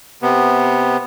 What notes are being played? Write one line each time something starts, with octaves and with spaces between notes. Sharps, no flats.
C3 B3